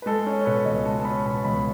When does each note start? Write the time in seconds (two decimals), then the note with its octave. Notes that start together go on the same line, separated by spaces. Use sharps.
0.02 B4
0.06 G#3 A4
0.26 C#4
0.41 C#5
0.45 B2 B4
0.65 C#2 D#5
0.85 G#3 A5
0.99 A5
1.05 C#4 B5
1.25 B2 B5
1.45 C#2 B5